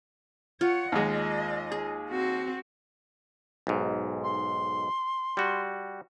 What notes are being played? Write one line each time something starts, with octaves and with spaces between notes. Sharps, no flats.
F4 C#5 F#5
D#2 G#3 D#5
G#4
C4 F#4
B1 G#2
C6
G3 F#4